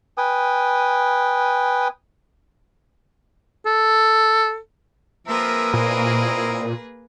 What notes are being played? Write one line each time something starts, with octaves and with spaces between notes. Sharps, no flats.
B4 G5 G#5 D#6
A4
F3 A#3 C4 G#4 A#4 B4 E5
A#2 C4 E4 D#5